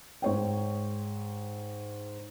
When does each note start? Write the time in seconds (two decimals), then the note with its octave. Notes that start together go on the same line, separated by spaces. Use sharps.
0.22 G#2 C#5 G5